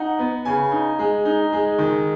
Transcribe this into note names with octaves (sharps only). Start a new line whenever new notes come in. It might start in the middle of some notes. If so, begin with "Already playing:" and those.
Already playing: D#4 F#5
B3
C#3 G#5
D#4
G#3
D#4
G#3
D#3